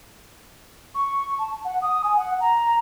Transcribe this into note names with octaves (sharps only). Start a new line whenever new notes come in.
C#6
A5
F#5
D#6
G#5
F#5
A#5